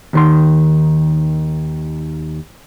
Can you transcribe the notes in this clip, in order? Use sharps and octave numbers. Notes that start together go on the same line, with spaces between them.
D#2 D#3 C6